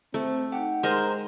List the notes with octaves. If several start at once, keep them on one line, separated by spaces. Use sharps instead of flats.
A3 C4 D#4
D#4 G4 F#5
G#3 A#4 C5